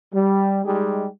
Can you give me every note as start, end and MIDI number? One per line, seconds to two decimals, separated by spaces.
0.14 0.61 55
0.65 1.07 55
0.65 1.07 56
0.65 1.07 63
0.65 1.07 67
0.65 1.07 68